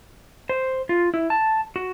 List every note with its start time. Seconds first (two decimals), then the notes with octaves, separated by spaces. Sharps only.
0.49 C5
0.89 F4
1.14 E4
1.30 A5
1.76 F#4